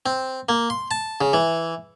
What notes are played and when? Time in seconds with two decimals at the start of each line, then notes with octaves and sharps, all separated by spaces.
0.06 C4
0.49 A#3
0.70 C6
0.91 A5
1.21 C#3
1.33 E3